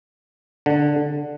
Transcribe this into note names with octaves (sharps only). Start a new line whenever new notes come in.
D3